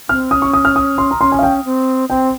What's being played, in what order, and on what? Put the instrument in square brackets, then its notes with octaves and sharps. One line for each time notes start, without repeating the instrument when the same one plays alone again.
[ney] C4 [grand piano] F6
[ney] C#4 [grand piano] D#6
[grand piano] C#6
D#6
F6
D#6
C6
A#5
[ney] C#4 [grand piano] C6
[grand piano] G#5
F5
G5
[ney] C4
[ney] C4 [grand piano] G5